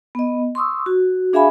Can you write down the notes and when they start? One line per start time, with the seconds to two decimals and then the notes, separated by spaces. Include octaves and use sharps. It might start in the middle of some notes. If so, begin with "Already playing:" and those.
0.15 B3 D#5
0.55 C6 C#6 D#6 E6
0.86 F#4
1.33 D4 G#4 E5 F5 G#5 B5